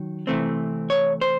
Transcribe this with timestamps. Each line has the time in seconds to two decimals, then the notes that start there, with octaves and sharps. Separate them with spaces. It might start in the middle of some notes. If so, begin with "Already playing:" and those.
Already playing: D#3 F#3
0.27 C3 E3 A3 C4
0.90 C#5
1.21 C5